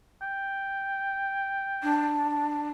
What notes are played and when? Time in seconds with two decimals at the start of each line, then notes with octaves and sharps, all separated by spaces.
0.22 G5
1.83 D4